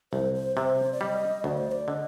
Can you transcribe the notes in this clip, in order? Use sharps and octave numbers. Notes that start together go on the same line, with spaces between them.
C2 C5
C5
C3 C5
D5
G3 D#5
D2 D5
C5
D5
D3 D#5